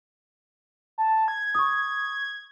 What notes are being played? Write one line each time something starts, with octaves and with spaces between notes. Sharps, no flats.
A5
G#6
C#6 D#6